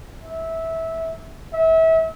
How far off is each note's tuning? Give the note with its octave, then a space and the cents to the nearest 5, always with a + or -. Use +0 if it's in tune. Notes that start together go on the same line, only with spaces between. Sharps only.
E5 -15
E5 -30